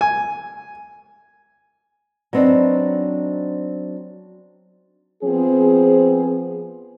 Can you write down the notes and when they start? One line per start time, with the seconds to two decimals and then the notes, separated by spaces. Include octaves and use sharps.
0.01 G#5
2.33 F#3 B3 C4 D4 D#4
5.24 F3 B3 C4 G#4